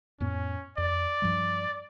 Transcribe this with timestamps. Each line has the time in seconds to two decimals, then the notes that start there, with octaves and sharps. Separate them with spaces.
0.20 F2 A2 B3 C#4
0.78 F2 D5
1.22 G2 F3 G3